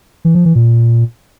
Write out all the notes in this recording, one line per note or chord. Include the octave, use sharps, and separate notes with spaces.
E3
F3
E3
A#2